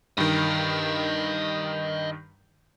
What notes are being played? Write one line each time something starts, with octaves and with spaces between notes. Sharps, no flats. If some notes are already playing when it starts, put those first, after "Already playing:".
G2 D#3 D#5 G5